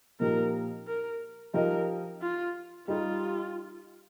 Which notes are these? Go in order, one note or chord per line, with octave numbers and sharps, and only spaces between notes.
A#2 F3 D#4 G4 A#4
A#4
F3 D#4 G4 A#4 D#5
F4
G3 D#4 F4 G4